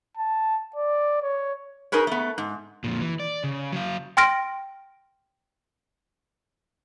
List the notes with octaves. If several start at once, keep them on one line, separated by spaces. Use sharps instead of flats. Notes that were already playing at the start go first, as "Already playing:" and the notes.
A5
D5
C#5
D#4 G#4 A#4 B4 C#5
A3 B3
G#2
F2 A#2
E3
D5
C#3
F#3 F5
G5 C6 F6 A#6 D7